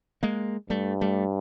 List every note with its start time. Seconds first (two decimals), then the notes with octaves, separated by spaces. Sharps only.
0.23 G#3 A#3
0.70 G2 G3 A3
1.01 G3 A3